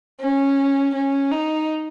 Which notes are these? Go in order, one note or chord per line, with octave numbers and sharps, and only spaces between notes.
C#4
C#4
D#4